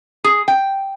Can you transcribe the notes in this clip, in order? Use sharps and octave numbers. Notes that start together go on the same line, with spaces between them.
G#4
G5